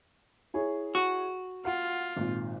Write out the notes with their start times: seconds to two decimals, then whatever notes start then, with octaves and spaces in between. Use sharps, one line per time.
0.54 E4 G#4 C#5
0.95 F#4
1.65 F4 F#5
2.17 G#1 A#2